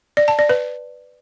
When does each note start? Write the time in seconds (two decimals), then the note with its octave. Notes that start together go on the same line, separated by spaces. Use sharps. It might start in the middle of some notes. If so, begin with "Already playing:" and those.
0.17 D5
0.28 A5
0.39 D5
0.49 B4